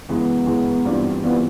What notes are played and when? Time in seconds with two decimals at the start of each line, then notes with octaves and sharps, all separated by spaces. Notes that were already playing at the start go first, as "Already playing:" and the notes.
0.09 F#2 C#3 E3 G#3 B3
0.46 F#2 C#3 E3 G#3
0.85 G2 E3 G3 C4 F4
1.23 G2 E3 G3 B3 C4 F4